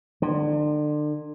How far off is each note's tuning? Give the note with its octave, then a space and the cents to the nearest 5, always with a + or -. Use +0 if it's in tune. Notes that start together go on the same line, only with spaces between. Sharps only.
D3 +35